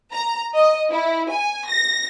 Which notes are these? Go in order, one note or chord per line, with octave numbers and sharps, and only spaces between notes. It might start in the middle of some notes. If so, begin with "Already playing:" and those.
A#5
D#5
E4
G#5
A#6